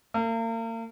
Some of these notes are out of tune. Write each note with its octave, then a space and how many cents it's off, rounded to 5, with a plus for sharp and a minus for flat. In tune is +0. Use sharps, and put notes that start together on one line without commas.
A#3 -40